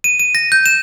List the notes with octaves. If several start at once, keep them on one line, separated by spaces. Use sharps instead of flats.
D#7
D#7
A#6
G6
E7